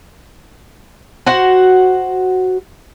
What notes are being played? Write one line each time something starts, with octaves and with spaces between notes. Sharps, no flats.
F#4 C5 F#5